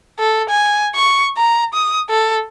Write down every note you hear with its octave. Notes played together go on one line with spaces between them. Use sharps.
A4
G#5
C#6
A#5
D#6
A4